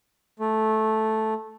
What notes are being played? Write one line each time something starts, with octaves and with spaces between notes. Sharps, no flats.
A3